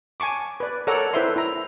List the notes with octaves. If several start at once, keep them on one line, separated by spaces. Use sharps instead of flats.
G#5 A5 C#6 D6
B4 D5
A4 A#4 C#5 D5 F#5 A#5
E4 A4 B4 C5 E5 C6
E4 A#5